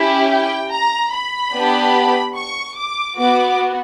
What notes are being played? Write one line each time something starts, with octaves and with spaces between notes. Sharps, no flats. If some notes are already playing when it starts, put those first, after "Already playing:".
Already playing: C#4 E4 G4 E5
G5
A#5
B5
B3 D4 G4
C#6
D6
B3 F#4 D6